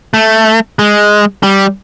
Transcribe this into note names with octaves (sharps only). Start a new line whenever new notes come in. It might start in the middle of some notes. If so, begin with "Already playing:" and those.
A3
G#3
G3